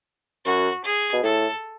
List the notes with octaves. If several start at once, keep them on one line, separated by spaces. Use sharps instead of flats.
F#2 F#4
G#4
B2
A2 A4